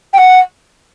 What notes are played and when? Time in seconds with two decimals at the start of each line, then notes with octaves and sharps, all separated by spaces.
0.13 G5
0.18 F#5